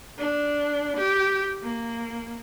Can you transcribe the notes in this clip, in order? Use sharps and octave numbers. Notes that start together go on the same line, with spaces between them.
D4
G4
A#3